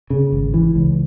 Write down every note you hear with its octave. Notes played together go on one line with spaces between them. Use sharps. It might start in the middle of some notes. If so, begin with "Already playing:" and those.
C#3
G#1
E3
C#2